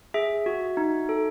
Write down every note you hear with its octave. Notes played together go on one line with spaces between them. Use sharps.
G#4 E5
F#4
D#4
A4